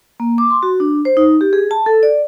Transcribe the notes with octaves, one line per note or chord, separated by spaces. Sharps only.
A#3
D6
C6
F#4
D4
C5
D#4
G4
G#4
A5
A4
D5